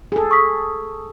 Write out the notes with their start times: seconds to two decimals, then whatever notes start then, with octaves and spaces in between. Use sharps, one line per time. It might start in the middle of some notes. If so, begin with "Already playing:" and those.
0.12 G#4 A4
0.31 C#6 D#6 B6